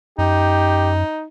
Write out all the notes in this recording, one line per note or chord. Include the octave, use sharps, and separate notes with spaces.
F#2 D#4 G4